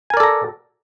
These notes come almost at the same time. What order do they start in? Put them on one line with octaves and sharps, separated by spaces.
G#5 A#4 D5 A4 A#5